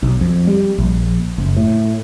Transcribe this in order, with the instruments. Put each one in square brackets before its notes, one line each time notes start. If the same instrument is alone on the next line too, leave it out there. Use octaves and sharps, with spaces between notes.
[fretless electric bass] B1
F2
G3
A#1
F#1
A2